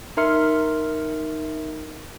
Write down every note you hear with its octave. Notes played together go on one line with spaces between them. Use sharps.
D#4 A#4 E5 C6 F6 C#7